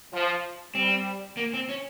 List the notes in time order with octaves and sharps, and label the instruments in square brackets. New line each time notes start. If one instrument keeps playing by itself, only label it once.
[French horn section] F3
[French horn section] G3 [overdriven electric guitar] C4
[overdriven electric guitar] A#3
C4
C#4